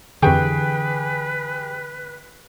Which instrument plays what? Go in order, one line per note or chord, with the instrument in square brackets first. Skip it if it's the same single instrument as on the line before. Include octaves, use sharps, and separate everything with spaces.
[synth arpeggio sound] F2 C#6 [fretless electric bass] D3 E3 [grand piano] G4 G#4 G5 [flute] B4